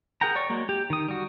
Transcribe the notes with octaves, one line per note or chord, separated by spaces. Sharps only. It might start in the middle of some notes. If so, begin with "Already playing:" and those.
G#4 A#4 F#5 G5 A#5
C#5 D5 C#6
F#3 G#3 A#3
G4
D#3 D#6
G3 F#4